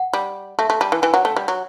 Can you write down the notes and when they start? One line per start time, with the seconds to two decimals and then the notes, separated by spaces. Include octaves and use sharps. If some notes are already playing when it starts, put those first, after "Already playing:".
Already playing: F#5
0.13 G3
0.59 A3 E5
0.70 A3
0.81 G3 A5
0.92 E3
1.02 E3 G5
1.14 F#3 F#5
1.25 A3 G5
1.36 G3
1.48 F#3